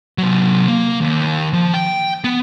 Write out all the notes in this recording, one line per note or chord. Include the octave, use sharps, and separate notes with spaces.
C3 F#3
A#3
D#2
F3
G5
B3